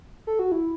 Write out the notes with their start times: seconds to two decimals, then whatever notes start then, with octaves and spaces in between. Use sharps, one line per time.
0.27 A4
0.39 F#4
0.52 E4